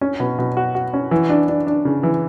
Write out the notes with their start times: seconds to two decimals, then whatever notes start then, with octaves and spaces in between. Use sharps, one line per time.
0.01 C#4
0.20 B2
0.38 B2
0.57 F#4
0.75 F#4
0.94 C#4
1.11 E3
1.30 D4
1.48 D4
1.67 D4
1.85 C#3
2.03 E3